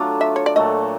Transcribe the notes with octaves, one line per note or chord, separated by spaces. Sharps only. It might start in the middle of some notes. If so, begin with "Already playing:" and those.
Already playing: F#3 A3 D4 F4
E5
C#5
D5
A#2 F#3 A3 D#5